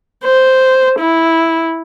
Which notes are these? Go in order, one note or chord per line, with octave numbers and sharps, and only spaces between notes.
C5
E4